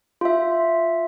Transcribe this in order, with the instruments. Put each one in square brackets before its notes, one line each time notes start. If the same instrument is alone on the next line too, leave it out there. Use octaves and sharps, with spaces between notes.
[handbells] F4 E5